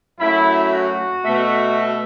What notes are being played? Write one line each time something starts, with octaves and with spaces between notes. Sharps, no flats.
F#2 F#3 A3 E4
F#4
B2 A3